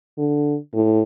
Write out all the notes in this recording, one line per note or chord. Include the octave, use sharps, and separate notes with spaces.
D3
A2